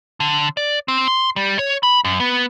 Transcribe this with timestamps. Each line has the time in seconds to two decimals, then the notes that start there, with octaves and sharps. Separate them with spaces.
0.20 D3
0.57 D5
0.88 C4
1.08 C6
1.36 G3
1.59 C#5
1.83 B5
2.05 F#2
2.20 B3